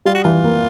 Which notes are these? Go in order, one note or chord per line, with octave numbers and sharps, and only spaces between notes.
G3 F4
F#4
E3 F4
A#3